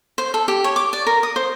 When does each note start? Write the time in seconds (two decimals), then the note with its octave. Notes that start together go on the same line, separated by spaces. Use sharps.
0.18 C5
0.34 A4
0.48 G4
0.64 C#5
0.76 D6
0.93 D5
1.07 A#4
1.23 D#6
1.36 C5